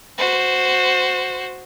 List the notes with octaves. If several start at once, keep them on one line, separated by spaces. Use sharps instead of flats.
F#4 C5